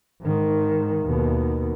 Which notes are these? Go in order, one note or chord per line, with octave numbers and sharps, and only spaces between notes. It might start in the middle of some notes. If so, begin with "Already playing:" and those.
G#2 D#3
D#2 B2